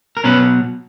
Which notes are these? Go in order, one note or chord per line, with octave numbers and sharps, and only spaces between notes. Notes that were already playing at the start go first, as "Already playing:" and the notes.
A#4
B2 F#3 C#4 B4